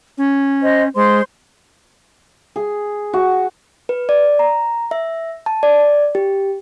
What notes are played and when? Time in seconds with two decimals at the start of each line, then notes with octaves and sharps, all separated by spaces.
0.18 C#4
0.62 C5 D#5
0.95 G#3 C5 C6
2.56 G#4
3.13 F#4
3.89 B4
4.09 D5
4.39 A#5
4.91 E5
5.46 A5
5.63 D5
6.15 G4